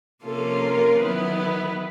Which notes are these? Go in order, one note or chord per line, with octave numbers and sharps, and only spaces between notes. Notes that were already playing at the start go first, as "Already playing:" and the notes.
C3 F3 A#3 C#4 F4 A4
A#4
D#3 F#3 B3 E4 B4
B4